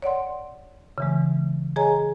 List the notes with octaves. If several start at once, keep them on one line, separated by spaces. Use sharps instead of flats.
C#5 D5 F#5 C6
C#3 E3 G#3
G#4 C#5 D#5 G#5 A#5